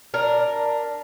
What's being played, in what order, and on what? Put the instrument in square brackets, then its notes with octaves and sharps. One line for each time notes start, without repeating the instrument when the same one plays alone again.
[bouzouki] D4 A#4